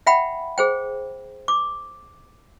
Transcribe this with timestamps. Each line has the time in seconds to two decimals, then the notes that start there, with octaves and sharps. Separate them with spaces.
0.07 E5 F#5 G5 B5
0.58 G#4 C5 G5
1.48 D6